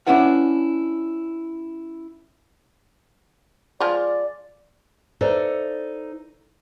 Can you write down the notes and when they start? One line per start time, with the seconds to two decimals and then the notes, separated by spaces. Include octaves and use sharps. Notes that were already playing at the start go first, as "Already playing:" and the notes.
0.07 C#4 D4 E4 B4 F#5
3.80 F3 G#3 F4 D5
5.21 D#4 A4 B4 C5 D5 E5